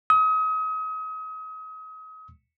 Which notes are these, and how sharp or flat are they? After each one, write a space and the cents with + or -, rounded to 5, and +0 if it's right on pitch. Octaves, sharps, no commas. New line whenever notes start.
D#6 +35